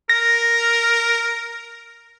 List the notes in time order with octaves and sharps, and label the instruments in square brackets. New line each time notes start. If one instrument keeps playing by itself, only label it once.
[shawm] A#4 [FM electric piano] A#6